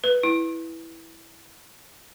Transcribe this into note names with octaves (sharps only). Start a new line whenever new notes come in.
B4
E4